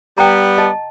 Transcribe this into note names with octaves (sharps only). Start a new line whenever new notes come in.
G3 B3 G5 A#5
D#5 A5